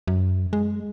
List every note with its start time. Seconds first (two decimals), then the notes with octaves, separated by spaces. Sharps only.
0.07 F#2
0.53 G#3